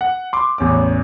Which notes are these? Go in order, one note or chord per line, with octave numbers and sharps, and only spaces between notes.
F#5
C6 D6
A1 E2 C#4 D6